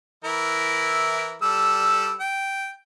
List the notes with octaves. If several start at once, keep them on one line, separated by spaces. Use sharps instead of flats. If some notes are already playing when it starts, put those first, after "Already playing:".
E3 E4 A#4
G3 A4 E6
G5